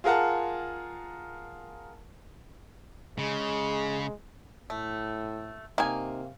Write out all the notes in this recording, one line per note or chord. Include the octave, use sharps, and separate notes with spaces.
F4 G#4 A#4 F#5 A5
C#3 G#3
A2 A3
C3 D#3 A#3 G#5